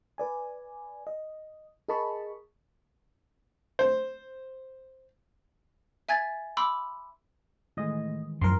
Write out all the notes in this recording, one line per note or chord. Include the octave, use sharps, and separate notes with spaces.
B4 D5 G#5
D#5
G#4 A#4 D#5 A5 B5 C#6
C5
E5 G#5 G#6 A6
B5 C6 D6 E6
A2 D#3 E3 G#3 D#5
F#2 A2 F3 A#4 C6